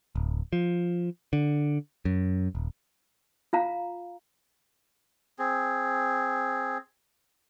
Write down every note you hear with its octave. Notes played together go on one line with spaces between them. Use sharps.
D1
F3
D3
F#2
D#1
F4 F5 A#5
C4 G#4